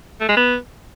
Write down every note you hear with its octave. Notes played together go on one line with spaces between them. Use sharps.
A3
G#3
B3